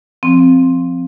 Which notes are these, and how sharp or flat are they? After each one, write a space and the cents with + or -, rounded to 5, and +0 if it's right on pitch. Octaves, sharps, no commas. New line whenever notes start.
F3 -5 C4 +0